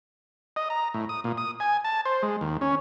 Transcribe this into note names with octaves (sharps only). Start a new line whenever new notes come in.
D#5
A#5
A2
D#6
A#2
D#6
G#5
A5
C5
G#3
D#2
C#4